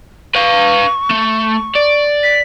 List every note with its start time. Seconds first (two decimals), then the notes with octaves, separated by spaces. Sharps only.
0.35 B4 F5 C#6
1.10 A3
1.76 D5
2.23 B6